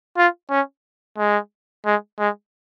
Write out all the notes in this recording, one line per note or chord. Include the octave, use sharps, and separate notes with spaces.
F4
C#4
G#3
G#3
G#3